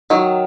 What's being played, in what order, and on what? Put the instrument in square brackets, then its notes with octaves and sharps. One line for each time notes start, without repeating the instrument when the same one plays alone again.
[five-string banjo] D#3 F#3